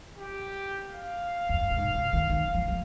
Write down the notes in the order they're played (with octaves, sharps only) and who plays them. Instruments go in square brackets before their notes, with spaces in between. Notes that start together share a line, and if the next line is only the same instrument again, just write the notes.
[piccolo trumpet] G4
F5
[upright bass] F2
G2
B2
G#2
C3
D#3
D#3
F3
F3